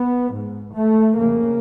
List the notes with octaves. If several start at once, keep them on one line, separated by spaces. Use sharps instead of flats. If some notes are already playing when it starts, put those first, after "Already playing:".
Already playing: B3
G#2
A3
F2 C#3 A#3